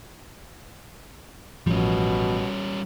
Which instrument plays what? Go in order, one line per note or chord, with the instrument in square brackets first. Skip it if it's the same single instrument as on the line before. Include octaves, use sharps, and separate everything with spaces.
[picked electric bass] A1 F3 [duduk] B2 [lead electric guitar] G3 C#4